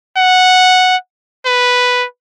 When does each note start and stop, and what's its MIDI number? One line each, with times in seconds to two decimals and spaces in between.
0.17 0.96 78
1.46 2.05 71